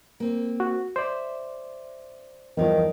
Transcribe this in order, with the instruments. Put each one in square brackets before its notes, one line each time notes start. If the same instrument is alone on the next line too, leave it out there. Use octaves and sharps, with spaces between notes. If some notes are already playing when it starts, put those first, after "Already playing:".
[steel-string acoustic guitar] A#3 C4
[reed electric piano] F#4
[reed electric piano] C5 D5 [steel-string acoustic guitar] E5
[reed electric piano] E2 F3 [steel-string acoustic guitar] G2 D#4 D5 [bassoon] D#3